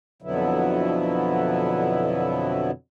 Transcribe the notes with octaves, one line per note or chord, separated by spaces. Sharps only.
F2 B2 D3 F#3 B3 E4